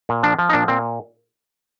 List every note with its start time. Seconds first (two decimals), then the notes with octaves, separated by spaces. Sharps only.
0.09 A#2
0.23 F3 D4
0.39 F3
0.49 D#4
0.53 A#2 D4
0.68 A#2 C4